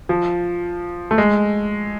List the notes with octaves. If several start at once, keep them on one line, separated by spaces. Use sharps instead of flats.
F3
A3
G#3